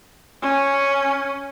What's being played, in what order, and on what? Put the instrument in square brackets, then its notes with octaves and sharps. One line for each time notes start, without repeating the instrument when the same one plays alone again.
[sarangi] C#4